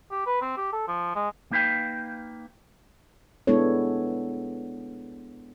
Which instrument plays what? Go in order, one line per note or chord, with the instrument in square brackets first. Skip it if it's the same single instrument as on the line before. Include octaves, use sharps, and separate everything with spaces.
[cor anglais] G4
B4
C4
G4
A4
F3
G#3
[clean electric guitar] A#3 D#4 B4 F5 G5
[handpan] G#3 B3 D4 E4 A4 C#5